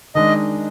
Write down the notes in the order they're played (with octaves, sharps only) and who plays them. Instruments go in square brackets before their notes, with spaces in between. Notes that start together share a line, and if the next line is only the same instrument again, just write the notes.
[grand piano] D#3 G#3 D4 [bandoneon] D#5